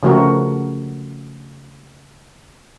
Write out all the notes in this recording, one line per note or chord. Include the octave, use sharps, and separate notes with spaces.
C#3 F3 A3 F#4 A#4